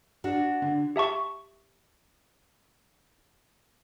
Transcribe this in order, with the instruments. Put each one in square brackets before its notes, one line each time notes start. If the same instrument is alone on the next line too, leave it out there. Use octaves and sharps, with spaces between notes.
[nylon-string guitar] D4 F#4
[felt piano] D3
[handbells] G4 E5 A5 C#6